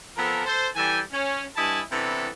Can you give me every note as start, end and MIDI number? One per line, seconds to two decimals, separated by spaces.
0.17 0.44 53
0.17 0.44 59
0.17 0.44 60
0.17 0.44 69
0.17 0.44 70
0.46 0.68 69
0.46 0.68 72
0.76 0.99 52
0.76 0.99 55
0.76 0.99 69
0.76 0.99 79
0.76 0.99 80
1.12 1.43 61
1.56 1.82 43
1.56 1.82 64
1.56 1.82 75
1.56 1.82 80
1.56 1.82 81
1.56 1.82 83
1.92 2.28 48
1.92 2.28 52
1.92 2.28 59
1.92 2.28 62
1.92 2.28 64
1.92 2.28 69